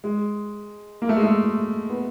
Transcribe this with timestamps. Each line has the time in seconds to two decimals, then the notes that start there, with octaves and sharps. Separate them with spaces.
0.04 G#3
1.02 A#3
1.09 A3
1.16 G#3
1.24 A3
1.90 B3